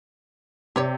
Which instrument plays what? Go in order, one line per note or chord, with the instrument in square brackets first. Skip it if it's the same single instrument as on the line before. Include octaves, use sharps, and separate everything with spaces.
[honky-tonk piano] C3 [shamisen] G4 C#5 D5